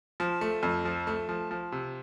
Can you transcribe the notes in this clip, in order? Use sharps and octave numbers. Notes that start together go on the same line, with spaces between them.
F3
A3
F2
F3
A3
F3
F3
C3